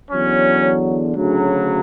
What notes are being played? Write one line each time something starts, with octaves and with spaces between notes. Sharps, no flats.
E2 D3 F#3 C#4
D2 C#3 F#3